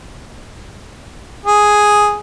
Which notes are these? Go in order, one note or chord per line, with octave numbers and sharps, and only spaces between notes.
G#4